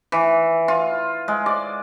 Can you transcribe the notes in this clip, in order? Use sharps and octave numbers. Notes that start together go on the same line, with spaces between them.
E3
F4
G#3
D5